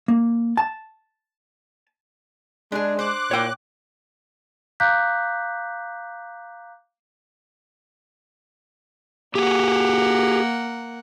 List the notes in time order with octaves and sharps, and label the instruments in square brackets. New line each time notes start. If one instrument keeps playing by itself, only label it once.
[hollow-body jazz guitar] A#3
A5
[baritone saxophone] G#3 [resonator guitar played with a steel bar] D4 G#4
[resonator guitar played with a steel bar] C5 [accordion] D6 F#6
[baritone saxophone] A#2 [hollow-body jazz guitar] C#5 G5
[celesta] F5 A#5 D6 F#6 G6 B6
[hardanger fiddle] A#3 F#5 [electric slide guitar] G4 G#4